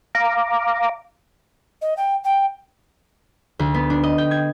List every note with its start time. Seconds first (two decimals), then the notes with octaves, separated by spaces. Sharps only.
0.15 F5 A#5 D6
1.81 D#5
1.97 G5
2.24 G5
3.59 D2
3.74 B3
3.90 D4
4.04 D#5
4.18 G5
4.31 G#6